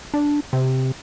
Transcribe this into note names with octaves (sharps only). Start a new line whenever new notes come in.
D4
C3